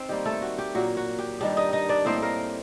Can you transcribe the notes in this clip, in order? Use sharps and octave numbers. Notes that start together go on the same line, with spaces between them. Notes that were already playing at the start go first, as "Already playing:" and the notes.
Already playing: C4 D#4 C5
D#3 G3 A#3 G4
A3 A4
F#4
G4
A#2 F#3 A#3 F#4
F#4
G4
G2 D#3 G3 D4 G4
D#4 D#5
D#4 D#5
D4 D5
A2 G3 A#3 C4 D#4 C5
A#3 A#4